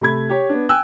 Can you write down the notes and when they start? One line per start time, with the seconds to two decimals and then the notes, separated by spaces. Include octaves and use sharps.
0.01 C3 A3 B5 G#6
0.29 G4 C#5
0.49 B3 D4
0.69 G5 G#5 E6 F#6